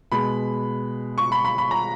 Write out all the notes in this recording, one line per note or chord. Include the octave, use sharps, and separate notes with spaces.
B2 G#3 B5
C#6
B5
B5
B5
A#5